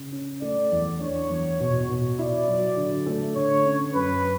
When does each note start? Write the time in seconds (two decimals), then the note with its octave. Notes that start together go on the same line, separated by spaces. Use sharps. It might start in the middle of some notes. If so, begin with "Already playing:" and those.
Already playing: C#3
0.12 C#4
0.42 A3 D5
0.72 E2
1.00 D4 C#5
1.30 E2
1.60 B2
1.89 B2
2.18 E4 D5
2.48 F#3
2.77 D3
3.06 A3
3.36 D3 C#5
3.65 C#4
3.94 F#2 B4